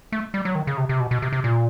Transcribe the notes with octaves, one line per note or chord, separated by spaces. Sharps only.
A3
G3
F#3
D#3
C#3
C3
C3
B2
B2
C3
C3
A#2